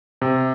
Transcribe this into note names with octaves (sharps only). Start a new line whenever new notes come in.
C3